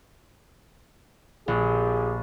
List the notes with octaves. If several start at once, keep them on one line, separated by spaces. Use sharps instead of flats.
A#1 F4 G4 G#4